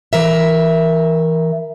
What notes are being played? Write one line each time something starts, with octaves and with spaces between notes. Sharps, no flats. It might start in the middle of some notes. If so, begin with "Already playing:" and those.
E3 A#4 E5